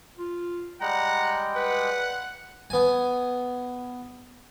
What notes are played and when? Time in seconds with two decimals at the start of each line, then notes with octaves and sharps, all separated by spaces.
0.17 F4
0.81 G3 G#3 F#5 G5 A#5
1.56 B4 F#5
2.70 B3 G#5